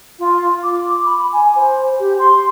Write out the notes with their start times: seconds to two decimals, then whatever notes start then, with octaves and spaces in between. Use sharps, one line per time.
0.19 F4
0.63 D6
1.05 B5
1.32 G#5
1.55 C5
1.99 G4
2.18 C6